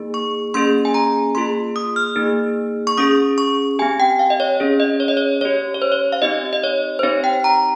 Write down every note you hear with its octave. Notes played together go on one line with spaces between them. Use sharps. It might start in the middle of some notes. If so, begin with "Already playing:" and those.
Already playing: A#3 D#4 G#4
C#6
A#3 C#4 G#4 C6
G#5
A#5
A#3 F4 G#4 C6
D#6
F6
A#3 D#4 G#4
C#6
C#4 G#4 D#6
C#6
C4 G4 G#5
G5
F5
D#5
C#5
C#4 G#4
D#5
C#5
D#5
C#5
C#4 G4 C#5
C#5
C5
C#5
F5
C4 D#4 G4 D#5
D#5
C#5
C5
C4 D#4 G4 C#5
G5
A#5